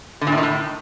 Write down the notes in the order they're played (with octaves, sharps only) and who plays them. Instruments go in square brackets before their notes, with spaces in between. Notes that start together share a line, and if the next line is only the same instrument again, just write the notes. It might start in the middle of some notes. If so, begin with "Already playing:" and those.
[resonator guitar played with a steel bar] D3
A#2
A2
D#3
A2